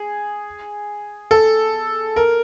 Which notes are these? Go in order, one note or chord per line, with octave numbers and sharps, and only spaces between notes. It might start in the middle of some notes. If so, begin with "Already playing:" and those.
Already playing: G#4
A4
A#4